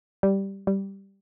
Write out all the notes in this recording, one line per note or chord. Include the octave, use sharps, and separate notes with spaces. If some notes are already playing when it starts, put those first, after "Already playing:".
G3
G3